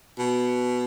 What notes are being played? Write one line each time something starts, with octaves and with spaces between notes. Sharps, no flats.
B2